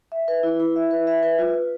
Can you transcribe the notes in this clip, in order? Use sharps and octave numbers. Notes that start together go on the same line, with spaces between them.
E5
B4
E4
E4
E5
B4
E5
B4
F4
F4